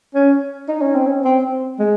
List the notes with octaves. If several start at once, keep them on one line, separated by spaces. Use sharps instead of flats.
C#4
D#4
C#4
C4
C#4
C4
G#3